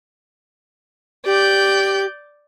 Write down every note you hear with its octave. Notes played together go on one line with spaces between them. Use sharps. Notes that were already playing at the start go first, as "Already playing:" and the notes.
G4 D5 G6